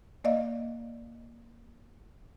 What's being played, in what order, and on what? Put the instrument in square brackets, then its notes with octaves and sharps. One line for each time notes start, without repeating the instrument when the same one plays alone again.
[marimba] A#3 D5 D#5 F5